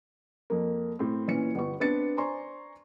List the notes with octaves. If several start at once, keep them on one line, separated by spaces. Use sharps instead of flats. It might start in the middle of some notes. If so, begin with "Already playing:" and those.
F2 A#3
A2 C4
A#2 E3 C#4 C#7
G1 B3 C#6
B3 C4 D4 A6 C#7
C5 D5 G#5 A#5 C6 C#6